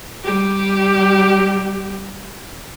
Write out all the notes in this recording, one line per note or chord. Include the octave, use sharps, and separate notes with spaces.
G3 G4